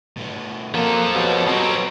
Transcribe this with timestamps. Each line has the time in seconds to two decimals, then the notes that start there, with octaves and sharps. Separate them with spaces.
0.17 B2 A3
0.74 F3 F#3 A#3 A4
1.15 B2 G4 C#5
1.48 F#3 C4 B4 A#5